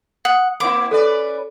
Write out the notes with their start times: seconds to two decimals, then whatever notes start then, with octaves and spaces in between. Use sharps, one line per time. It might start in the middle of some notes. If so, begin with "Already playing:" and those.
0.25 F#5 D#6
0.60 A#3 C4 E4 D6
0.91 C#4 A4 B4 D5